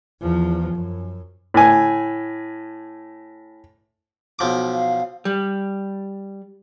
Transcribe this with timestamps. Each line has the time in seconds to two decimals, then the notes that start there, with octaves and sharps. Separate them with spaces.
0.21 E2 F3
0.74 F#2
1.54 A2 G#5
4.39 B1 F3 D6
4.74 F5
5.25 G3